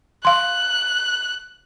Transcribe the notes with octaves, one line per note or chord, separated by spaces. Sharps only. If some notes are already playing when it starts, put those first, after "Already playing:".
F5 C6 F#6